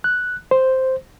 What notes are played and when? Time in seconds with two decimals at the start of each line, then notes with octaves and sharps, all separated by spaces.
0.04 F#6
0.51 C5